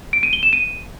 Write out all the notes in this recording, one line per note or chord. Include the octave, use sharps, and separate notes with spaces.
D7
D#7
G7
E7
D#7